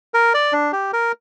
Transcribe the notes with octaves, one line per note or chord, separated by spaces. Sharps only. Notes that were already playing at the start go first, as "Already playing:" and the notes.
A#4
D5
D4
G4
A#4